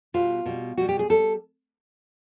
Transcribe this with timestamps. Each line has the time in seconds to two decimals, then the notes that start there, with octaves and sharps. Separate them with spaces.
0.14 B2 G3 F4
0.46 B2 G3
0.77 B2 G3 F#4
0.89 G4
0.99 G#4
1.10 G3 A4